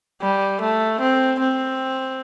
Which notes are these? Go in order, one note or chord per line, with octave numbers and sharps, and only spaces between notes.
G3
A3
C4
C4